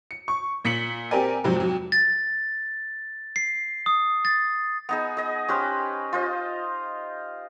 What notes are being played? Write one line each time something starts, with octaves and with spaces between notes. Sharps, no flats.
C#7
C#6
A#2 B6 C#7 F#7
C4 G4 A#4 D5 G#5
G#2 C3 F3 F#3
F2 F#3
A6
C7
D#6
A6
B3 D#4 G#4
G#4 D#5
C#4 G4 B4 C5
F4 C5 D#5